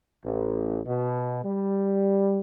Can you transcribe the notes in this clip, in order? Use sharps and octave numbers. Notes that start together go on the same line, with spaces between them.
A1
B2
G3